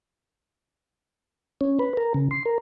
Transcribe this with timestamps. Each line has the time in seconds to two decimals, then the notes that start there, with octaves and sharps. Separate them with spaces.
1.61 C#4
1.79 B4
1.97 A#4
2.14 C#3
2.31 C6
2.46 A#4